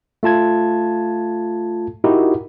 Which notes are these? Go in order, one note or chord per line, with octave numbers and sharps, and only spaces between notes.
A3 F4 A5 G#6
D#4 E4 F#4 G4 A#4